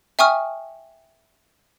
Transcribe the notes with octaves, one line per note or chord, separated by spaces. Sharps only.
E5 G5 G#5 C#6 D#6 F6